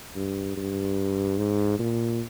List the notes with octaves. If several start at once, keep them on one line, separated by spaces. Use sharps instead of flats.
G2
G2
G#2
A#2